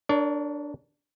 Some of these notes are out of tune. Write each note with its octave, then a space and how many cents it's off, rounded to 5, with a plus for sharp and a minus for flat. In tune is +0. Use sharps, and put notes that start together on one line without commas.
D4 +0 A#4 +0 C#5 +35